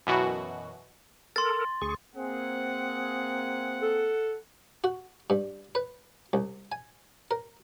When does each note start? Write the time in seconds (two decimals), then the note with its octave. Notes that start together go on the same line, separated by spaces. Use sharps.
0.07 F#2 B2 E3 F#4
1.36 A4 A#4 C6 A6
1.82 D2 G#4 C#6
2.15 A#3 C4 G#4 F#5
3.82 A4
4.84 F#4
5.30 G2
5.75 B4
6.33 C2
6.72 G#5
7.31 A#4